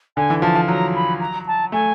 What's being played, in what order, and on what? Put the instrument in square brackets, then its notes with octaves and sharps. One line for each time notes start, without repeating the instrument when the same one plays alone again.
[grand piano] D3 [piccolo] G#5
[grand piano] E3
[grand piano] F3 [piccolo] A5
[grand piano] F3
[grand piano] F#3 [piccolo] A#5
[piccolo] B5
A#5
A5
[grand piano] A3 [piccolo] G#5